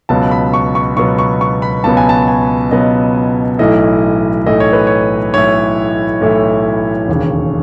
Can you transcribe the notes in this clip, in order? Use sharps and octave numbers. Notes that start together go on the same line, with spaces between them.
C#2 B2 F#3 B3 A5
B5
C#6
C#6
C#2 B2 F#3 B3 C#6
C#6
C#6
B5
C#2 B2 F#3 B3 A5
G#5
A5
G#5
C#2 B2 F#3 B3 D#5
B1 A2 E3 A3 E4 D#5
B1 A2 E3 A3 E4 D#5
C#5
B4
C#5
B1 A2 E3 A3 E4 C#5
B1 A2 E3 A3 E4
E1 D#2 C#3